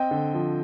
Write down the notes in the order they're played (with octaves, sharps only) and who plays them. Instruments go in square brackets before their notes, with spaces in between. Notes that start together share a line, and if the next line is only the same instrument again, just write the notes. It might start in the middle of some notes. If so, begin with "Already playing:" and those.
Already playing: [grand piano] C4 D#5 G5
D3
F3